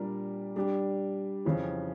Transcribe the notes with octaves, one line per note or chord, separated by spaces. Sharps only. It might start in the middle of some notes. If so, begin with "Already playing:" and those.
Already playing: A#2 G3 D4 G4 A#4
G3 D4 G4
F2 C#3 E3